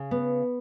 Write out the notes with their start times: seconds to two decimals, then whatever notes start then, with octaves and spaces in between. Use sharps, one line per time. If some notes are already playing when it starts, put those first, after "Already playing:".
Already playing: C#3
0.11 B3